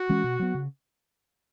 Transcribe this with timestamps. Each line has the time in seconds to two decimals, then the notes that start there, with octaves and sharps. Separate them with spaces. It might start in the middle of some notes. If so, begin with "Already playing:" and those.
Already playing: F#4
0.09 E3 G#3 C#4
0.24 B2
0.39 F#3 B3
0.54 C#3